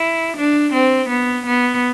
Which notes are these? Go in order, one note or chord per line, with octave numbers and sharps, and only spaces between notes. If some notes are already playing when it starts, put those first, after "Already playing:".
Already playing: E4
D4
C4
B3
B3